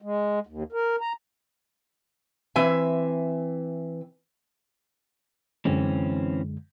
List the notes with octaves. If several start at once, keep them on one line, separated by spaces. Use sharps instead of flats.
G#3
D#2
A#4
A#5
E3 C4 E5 G#5
F#2 D3 E3 G#3 C4 C#4